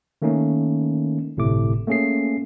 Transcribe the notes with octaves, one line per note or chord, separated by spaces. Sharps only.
D#3 A3 A#3 C#4 D#4
G1 A2 C3 A3 D6
A3 A#3 C#4 G#4 C7